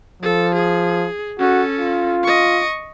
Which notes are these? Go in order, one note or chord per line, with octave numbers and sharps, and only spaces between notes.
F3 A4
G#4
C#4 F#4 A4
F4
D#5 C#6